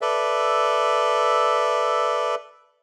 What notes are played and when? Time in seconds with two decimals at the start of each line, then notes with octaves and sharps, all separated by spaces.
0.01 A4 B4 D5 E5